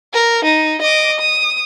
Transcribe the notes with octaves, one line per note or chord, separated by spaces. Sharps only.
A#4
D#4
D#5 D6
D#6